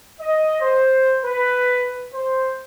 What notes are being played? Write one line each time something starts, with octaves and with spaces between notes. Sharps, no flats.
D#5
C5
B4
C5